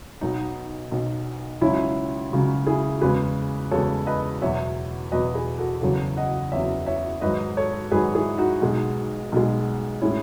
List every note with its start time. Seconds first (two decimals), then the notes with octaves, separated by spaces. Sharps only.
0.21 B1 B2 F#3 D#4
0.91 B1 B2 F#3
1.61 C#2 C#3 F#3 C#4 E4
2.31 C#2 C#3 F#3
2.66 E4 G#4
3.01 E2 C#3 G#3 G#4 B4
3.71 E2 C#3 G#3 A4 C#5
4.07 B4 D#5
4.42 E2 B2 F#3 C#5 E5
5.11 E2 B2 F#3 B4 D#5
5.35 G#4 B4
5.58 F#4 A4
5.81 F#1 E2 C#3 F#3 F#4 A4
6.17 D#5 F#5
6.52 F#1 E2 C#3 F#3 C#5 E5
6.86 C#5 E5
7.21 G#1 G#2 F#3 B4 D#5
7.57 A4 C#5
7.92 G#1 G#2 F#3 G#4 B4
8.15 E4 G#4
8.38 D#4 F#4
8.61 B1 B2 G#3
9.32 B1 B2 G#3
10.01 A2 G#3 C#4 E4